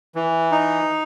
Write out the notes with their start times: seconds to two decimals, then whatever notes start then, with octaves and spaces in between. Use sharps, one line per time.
0.15 E3
0.52 D#4